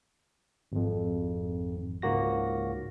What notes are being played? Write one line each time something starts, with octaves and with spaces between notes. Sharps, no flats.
G#1 F2
C#2 G#2 A#3 F#4 A#6